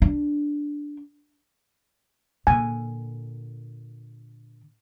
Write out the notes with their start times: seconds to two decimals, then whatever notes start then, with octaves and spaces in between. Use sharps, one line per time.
0.02 D4
2.47 A#2 D3 G#5